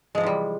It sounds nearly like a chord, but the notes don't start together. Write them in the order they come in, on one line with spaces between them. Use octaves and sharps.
G#3 F3 C3 E3 G3